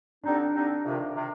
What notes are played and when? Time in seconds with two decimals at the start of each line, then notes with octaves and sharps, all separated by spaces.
0.24 D3 G3 C4 D4 D#4
0.55 D3 G3 C4 D#4
0.84 F2 C3 D#3
1.15 C3 D#3